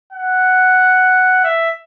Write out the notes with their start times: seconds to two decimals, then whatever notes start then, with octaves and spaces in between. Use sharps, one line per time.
0.13 F#5
1.44 E5